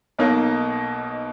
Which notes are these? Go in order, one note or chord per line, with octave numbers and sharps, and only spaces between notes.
B1 B2 A#3 D#4